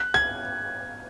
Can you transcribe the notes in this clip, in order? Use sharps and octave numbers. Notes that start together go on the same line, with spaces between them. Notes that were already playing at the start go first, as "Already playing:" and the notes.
Already playing: F#6
G#6